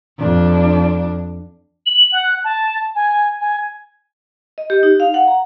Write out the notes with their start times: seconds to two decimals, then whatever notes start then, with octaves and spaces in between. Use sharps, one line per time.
0.18 F2 D4
1.86 F#7
2.12 F#5
2.44 A5
2.95 G#5
3.40 G#5
4.58 D#5
4.70 G4
4.83 D#4
5.00 F5
5.14 F#5
5.28 A#5